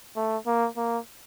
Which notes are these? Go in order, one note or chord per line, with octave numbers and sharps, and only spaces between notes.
A3
A#3
A#3